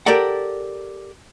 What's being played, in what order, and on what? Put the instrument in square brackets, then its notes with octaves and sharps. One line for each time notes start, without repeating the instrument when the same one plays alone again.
[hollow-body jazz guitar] G4 A4 A#4 D5 F#5